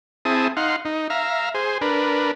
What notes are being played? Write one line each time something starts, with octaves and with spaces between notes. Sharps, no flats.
C4 E4 G#4 A5 D#6
D#4 F5 F#5 C6
D#4
E5 F5 A#5
G#4 C5
D4 A#4 B4